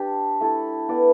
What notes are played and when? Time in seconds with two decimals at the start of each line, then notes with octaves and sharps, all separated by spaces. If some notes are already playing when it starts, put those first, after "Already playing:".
Already playing: D4 G4 D5
0.40 A3 E4 A4
0.89 B3 E4 B4 D5